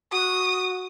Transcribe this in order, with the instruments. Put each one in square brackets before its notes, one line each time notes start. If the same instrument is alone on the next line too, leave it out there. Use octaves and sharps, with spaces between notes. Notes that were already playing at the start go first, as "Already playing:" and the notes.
[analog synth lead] F#4 [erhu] D#6